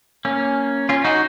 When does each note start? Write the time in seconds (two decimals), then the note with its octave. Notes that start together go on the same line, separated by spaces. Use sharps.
0.25 A#3 C#4
0.89 C#4 F4
1.05 D#4 F#4